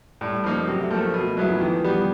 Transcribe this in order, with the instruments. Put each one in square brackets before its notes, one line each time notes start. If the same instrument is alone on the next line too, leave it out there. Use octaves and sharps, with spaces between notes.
[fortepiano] A2 [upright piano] G3
[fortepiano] F3 A#3 D#4
[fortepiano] C3 [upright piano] F#3
[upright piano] A3
[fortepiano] F3 [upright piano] A#3
[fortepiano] A3
[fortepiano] B2 [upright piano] A3
[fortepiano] F#3 B3 E4 [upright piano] G#3
[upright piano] F3
[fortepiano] D#3 [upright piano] E3
[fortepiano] G3 B3